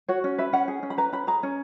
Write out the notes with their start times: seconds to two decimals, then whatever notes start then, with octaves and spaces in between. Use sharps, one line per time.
0.09 F#4 C#5
0.24 C#4
0.38 B4 E5
0.53 C#4 F#5
0.68 G#4
0.83 C#4
0.90 B5
0.98 B4 A#5
1.13 C#4 B5
1.27 G#4 A#5
1.43 C#4